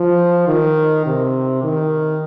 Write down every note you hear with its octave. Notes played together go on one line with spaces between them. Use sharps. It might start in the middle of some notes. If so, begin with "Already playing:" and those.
Already playing: F3
D#3
C3
D#3